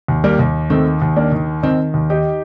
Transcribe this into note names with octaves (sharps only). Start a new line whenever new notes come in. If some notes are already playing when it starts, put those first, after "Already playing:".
D#2
G3 A#3
D#2
D#3 A3 C4
D#2
A#3 D4
D#3
D#3 C4 D#4
D#2
D#4 G4